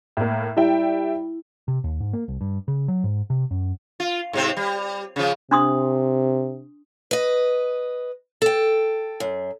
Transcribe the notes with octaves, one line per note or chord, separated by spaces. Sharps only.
A2 A#3
G3 E4 E5 G5
C3
D#2
G#2
A#3
C2
G2
C#3
F#3
G#2
C3
F#2
F4
G#2 C3 C4
G3
C#3 F3
C3 D4 C6 D#6
B4 D#5
A4 G5
F#2